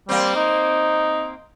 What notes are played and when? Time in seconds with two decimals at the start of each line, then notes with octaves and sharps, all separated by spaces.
0.09 G3 A#3 C4
0.36 D#4